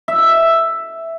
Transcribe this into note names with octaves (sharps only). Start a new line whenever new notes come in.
E5